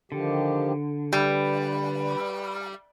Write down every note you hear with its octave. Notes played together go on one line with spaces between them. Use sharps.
D3 D#3 F3 G4
G3 B4